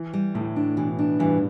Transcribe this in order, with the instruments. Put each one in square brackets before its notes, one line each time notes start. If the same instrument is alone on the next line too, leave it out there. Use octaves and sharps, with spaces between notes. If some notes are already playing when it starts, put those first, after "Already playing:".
Already playing: [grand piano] E3
[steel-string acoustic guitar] G3
[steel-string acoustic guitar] D2 [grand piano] A2
[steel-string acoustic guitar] D4
[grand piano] B2 [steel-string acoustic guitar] E3
[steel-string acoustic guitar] D4
[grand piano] G2 [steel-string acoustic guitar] E3